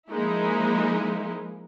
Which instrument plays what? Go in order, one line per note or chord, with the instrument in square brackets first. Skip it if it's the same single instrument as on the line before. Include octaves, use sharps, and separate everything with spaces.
[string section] F3 G#3 A#3 D#4 E4